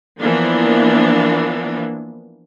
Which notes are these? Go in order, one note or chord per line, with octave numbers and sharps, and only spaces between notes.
E3 F3 A#3 B3 D4